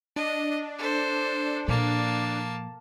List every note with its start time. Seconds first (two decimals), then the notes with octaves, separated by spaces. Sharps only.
0.16 D4 D#5
0.78 A4 C5
1.68 A#2 F3 A#3 A5